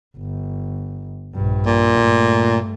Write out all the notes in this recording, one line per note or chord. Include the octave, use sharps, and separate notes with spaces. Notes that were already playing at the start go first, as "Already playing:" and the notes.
G1
A#1 G2
A#2
G2 A3